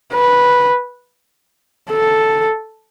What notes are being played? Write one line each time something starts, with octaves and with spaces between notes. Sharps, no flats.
B4
A4